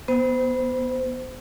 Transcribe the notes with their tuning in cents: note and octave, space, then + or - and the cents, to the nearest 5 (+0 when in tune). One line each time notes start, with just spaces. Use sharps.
B3 -15 C5 -25